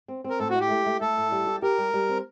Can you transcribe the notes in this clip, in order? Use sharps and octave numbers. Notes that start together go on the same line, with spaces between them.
C4
C4
A#4
A2 A4
F#4
A3
G4
A3
A3
A3 A4
A2
G3
G4
G4 A#4
G3
G3
C4